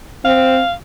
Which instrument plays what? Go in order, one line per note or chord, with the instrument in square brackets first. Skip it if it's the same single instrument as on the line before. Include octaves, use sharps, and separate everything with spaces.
[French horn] C4 [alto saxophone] F5